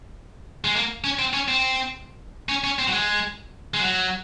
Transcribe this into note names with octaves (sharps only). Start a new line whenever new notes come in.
G#3
A#3
C#4
C4
C#4
C4
C#4
C#4
C4
F#3
G#3
G#3
F#3